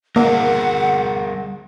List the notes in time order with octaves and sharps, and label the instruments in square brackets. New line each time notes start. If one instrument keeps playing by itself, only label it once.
[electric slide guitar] G3 G#4 A#4 [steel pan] A#3 [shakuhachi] F#5